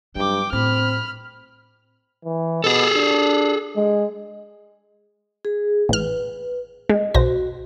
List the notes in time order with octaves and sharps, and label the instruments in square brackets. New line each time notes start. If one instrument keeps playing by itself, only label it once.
[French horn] G2 [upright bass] F#3 [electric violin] G5 D6
[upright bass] A2 [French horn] C4 [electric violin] B5 F6
[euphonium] E3
[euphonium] B2 [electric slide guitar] G#4 A4
[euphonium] D4
G#3
[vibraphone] G#4
[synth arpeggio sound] A1 F6 [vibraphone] B4
[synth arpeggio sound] G#3 [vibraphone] D#5
[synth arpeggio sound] B1 C5 A#6 [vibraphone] F#4